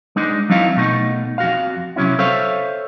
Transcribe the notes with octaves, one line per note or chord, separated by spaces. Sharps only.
G#3 D4 D#4
F3 F#3 C4 D#4 E4 F5
B2 A3 D#4
F2 F#4 F5
C3 F#3 C#4 E4
A4 C5 C#5 E5 F5